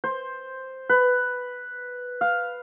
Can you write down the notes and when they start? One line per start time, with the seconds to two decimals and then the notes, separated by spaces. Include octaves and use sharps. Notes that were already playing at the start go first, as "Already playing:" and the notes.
0.04 C5
0.89 B4
2.21 F5